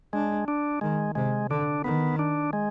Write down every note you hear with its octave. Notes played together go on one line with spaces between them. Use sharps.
G#3 D4
D4
D#3 G#3
C3 G#3
D3 D4
D#3 B3
D4
G#3